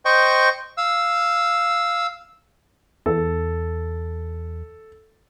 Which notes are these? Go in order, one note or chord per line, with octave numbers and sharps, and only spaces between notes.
C5 D#5 G5 C#6
F5 E6
E2 A4